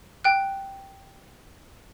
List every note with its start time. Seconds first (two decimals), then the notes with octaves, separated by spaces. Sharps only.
0.24 G5 F#6